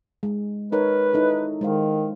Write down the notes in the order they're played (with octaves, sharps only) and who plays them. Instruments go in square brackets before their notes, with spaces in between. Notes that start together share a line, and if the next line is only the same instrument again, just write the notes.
[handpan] G#3
[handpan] D#4 A#4 C#5 [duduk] B4
[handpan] D#4 E4 A4
[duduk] D#3 [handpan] G#3 C5 F5